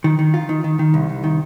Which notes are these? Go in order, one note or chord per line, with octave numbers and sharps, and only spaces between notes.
D#3
D#3
F4
D#3
D#3
D#3
C2
C2
D#3